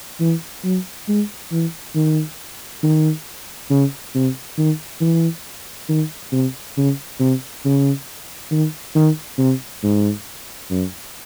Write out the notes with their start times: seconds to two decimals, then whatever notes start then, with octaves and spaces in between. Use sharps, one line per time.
0.20 E3
0.64 F#3
1.08 G#3
1.52 E3
1.95 D#3
2.83 D#3
3.70 C#3
4.15 C3
4.57 D#3
5.01 E3
5.89 D#3
6.32 C3
6.77 C#3
7.20 C3
7.64 C#3
8.51 D#3
8.95 D#3
9.38 C3
9.83 G#2
10.70 F#2